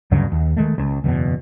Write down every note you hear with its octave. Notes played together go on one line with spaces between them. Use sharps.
D2 G2 C#3 F#3
D#2
D#3 G#3 A3
C#2
F#1 E2 G#2 B2